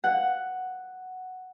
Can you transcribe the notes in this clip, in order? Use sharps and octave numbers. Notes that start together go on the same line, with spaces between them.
F#5